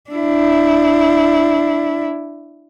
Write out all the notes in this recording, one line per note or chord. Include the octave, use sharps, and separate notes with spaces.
D4 E4